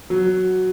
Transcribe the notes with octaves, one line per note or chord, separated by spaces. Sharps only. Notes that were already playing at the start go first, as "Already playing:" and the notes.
F#3